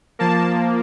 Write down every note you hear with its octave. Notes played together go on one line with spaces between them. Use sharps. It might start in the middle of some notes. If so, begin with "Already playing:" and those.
F3 A#3 A5